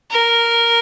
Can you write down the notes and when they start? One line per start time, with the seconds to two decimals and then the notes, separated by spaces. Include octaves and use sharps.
0.11 A#4